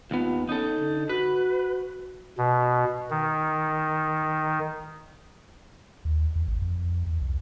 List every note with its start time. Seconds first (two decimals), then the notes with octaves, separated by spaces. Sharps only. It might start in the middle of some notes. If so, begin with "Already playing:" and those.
0.11 D#2 B3 F4
0.49 C#4 D#4 A4
0.79 D3
1.09 F#4 B4
2.38 B2
3.11 D#3
6.05 D#2
6.36 E2
6.48 A1
6.62 F2
7.07 E2
7.22 C2